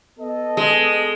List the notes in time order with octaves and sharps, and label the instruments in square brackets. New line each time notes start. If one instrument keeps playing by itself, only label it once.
[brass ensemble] B3 A4 D#5
[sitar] G#3